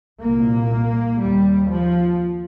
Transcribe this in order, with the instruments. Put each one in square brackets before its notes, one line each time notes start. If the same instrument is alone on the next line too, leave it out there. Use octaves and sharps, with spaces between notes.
[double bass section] C2 A#2 A#3
D#2 G3
F3